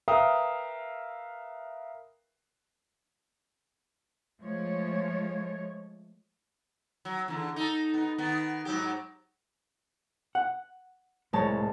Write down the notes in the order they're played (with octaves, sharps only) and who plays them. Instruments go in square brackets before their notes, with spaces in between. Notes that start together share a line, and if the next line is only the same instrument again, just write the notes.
[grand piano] A#4 B4 E5 F5 G5 D#6
[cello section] F3 G#3 A3 C#5
[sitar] F#3
E2 D3
D#4 A4
B3 D#4
D#3 B3
G#2 F#3 G4
[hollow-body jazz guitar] F#5
[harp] C2 G#3 A5 [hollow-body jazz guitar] A2 C#5